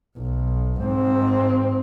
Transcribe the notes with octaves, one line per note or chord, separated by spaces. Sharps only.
B1
G#2 C4